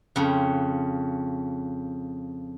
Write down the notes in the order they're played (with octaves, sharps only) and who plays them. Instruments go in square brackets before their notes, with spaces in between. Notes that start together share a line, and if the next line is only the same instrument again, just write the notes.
[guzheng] F2 C#3